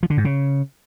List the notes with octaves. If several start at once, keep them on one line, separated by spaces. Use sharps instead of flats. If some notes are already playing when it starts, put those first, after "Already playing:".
F3
D3
G#2
C#3